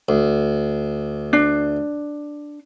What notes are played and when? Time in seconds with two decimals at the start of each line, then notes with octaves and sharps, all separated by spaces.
0.09 D2
1.33 D4